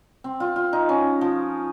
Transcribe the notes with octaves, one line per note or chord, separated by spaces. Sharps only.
C4
F4
F4
D#4
C#4
F3